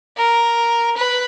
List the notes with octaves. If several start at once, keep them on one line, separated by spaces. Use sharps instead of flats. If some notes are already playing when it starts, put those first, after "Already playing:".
A#4
B4